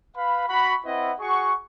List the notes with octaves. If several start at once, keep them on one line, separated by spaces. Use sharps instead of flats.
B4 F5 B5
F#4 B5
C4 E4 B4 D#5 F#5
F#4 G#4 F#5 C#6